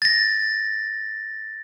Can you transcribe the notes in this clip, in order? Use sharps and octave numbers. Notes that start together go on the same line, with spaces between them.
A6 A#6